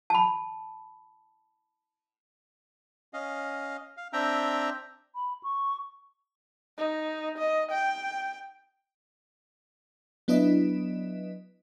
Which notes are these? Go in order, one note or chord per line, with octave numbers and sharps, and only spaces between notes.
A5 B5
C#4 D#5 F5
F5
C4 D4 E5 G5 A#5
B5
C#6
D#4
D#5
G5
F#3 B3 D4 E4 B4 D#5